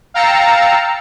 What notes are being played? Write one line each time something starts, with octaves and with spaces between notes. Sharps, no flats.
F5 G5 A#5 E6 A6 C#7